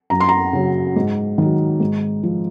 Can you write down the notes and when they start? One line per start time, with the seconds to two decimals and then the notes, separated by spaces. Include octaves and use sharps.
0.10 F#2 A#5
0.20 C6
0.29 A#5
0.53 C#3 F#3
0.96 G#2
1.38 D#3 F#3
1.80 G#2
2.23 F3